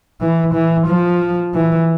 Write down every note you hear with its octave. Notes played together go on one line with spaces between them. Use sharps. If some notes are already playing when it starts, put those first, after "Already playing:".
E3
E3
F3
E3